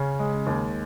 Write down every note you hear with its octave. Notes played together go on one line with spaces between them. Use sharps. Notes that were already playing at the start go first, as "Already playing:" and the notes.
Already playing: C#3 C#4
G#3
D#2